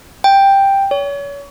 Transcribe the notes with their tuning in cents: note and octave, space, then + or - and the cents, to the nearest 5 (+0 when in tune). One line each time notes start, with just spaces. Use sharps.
G5 +5
C#5 +35